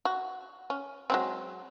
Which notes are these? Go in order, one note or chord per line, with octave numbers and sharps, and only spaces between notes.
F#4
C#4
F#3 G#3 C4